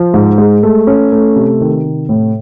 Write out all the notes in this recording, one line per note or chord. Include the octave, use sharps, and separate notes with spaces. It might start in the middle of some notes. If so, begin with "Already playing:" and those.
Already playing: F3
G#2
G#3
A3
C#4
A3
C3
D#3
C3
A2